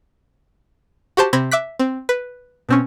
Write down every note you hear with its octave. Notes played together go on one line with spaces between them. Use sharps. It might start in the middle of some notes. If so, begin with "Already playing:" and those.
F#4 G4 C5 A5
C3 C4 B5 G#6 A#6
E5 D6 F#6 B6
C4
B4
B2 C4 C#4